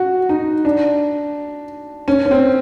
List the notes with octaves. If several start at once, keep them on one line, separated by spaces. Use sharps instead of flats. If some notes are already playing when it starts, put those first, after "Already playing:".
Already playing: F#4
D#4
D4
C#4
C#4
C4